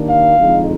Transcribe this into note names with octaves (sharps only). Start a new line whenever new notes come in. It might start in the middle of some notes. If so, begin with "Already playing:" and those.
Already playing: D#2 D#3 A#3 D4
F5
F2 D3 G#3 D#4